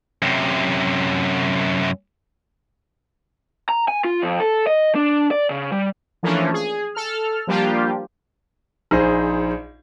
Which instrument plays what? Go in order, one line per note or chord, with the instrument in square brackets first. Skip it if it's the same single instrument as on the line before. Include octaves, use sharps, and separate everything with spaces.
[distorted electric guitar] F#2 C3
[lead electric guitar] A#5
G#5
F4
F2
A4
D#5
D4
D5
C#3
G3
[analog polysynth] E3 F3 A3 A#3 C#4 D4
G#4
A4 F6
F3 G3 A#3 D4 F4 G4
[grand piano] A#1 D#4 G#4 C5